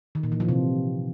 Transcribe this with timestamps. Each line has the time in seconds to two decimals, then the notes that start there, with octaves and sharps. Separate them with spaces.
0.15 D#3
0.23 A#2
0.32 E3
0.40 F3
0.49 C3